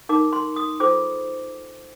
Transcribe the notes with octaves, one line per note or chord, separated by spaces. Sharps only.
D#4 A#4 D6
C6
D#6
F4 A4 C5 D6